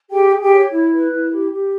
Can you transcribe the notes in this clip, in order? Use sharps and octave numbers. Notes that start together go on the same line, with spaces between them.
G4 G#4 G5
G#4
G4 G5
C#5
E4
B4
E4
G4
G4